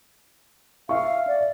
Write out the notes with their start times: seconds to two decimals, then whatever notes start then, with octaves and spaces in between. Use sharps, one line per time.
0.89 E5 F5 C#6
1.27 D5